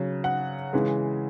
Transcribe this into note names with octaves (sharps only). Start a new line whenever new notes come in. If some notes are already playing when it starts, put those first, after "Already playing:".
Already playing: C#3 F#3
F#5
C#3 E3 G#3